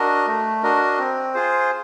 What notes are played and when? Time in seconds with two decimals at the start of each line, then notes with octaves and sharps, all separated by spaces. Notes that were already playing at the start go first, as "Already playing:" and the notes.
Already playing: D4 F#4 A#4 D#5
0.27 A3
0.63 D4 F#4 A#4 D#5
0.98 C4
1.34 F4 G#4 C5